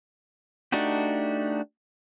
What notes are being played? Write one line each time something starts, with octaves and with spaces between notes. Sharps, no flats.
A3 D4 D#4 F#4 G4